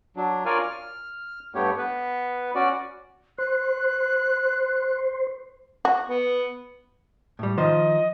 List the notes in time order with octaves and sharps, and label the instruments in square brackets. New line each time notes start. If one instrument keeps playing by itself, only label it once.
[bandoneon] F#3 D4
F4 A#4 C#5 D5 F5 G#5
F6
G2 A3 B3 G4 C#5
B3 B4
C#4 F#4 D5
[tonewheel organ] C5 [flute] F#6
[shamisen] F#4
[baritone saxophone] B3
[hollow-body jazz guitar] A2 G3
[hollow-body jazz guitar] D#3 F3 C5 [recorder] D#5